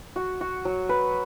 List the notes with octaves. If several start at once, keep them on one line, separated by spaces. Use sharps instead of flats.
F#4
F#4
F#3
B4